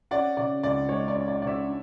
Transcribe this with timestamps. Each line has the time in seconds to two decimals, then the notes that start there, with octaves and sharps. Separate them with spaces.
0.11 C#4 D5 F#5
0.37 C#3 D5
0.63 C#2 D5
0.89 G#3 C#5
1.08 D5
1.15 C#4
1.28 D5
1.41 C#3 D5
1.47 C#5 E5
1.66 D4